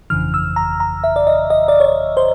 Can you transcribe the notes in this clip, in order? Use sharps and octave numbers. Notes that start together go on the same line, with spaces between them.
G1 F2 C#3 E3 F6
E6
A#5
A#5
E5
D5
D#5
D#5
D5
C#5
D5
C5